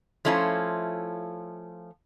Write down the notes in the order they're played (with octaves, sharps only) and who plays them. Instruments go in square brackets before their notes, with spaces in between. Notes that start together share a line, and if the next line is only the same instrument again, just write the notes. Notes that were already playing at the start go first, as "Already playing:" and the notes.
[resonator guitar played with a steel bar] F3 A3 C#4 E4 F4